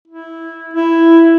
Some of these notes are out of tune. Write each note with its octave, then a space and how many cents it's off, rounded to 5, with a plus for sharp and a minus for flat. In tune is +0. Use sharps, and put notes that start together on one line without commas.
E4 -10
E4 +5